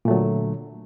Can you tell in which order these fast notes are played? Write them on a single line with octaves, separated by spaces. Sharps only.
A#2 A3 F#3 D3